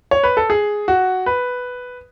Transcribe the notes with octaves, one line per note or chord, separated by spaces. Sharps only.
C#5
B4
A4
G#4
F#4
B4